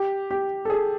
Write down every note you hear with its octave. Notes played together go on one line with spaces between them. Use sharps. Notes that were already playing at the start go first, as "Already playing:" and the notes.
Already playing: G4
G4
A4
G#4